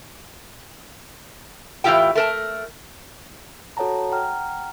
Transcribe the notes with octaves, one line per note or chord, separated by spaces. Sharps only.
A2 E3 E4 F4 G4 G5
A3 A#4 A5
F#4 A4 C#5 F#5 A5 A#5
F#5 G5 A#5 F6